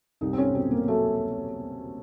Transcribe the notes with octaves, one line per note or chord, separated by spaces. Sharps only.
C2 D#4
C4
C#4
B2 C4
A#3
F#3 A3